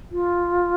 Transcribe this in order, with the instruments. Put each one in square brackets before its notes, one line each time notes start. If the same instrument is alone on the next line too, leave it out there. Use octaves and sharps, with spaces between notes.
[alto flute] F4